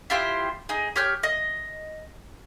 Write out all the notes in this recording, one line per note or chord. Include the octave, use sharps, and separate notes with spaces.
E4 F4 G4 C5
D#4 G#4
G4 C#5 F6 G6
D#5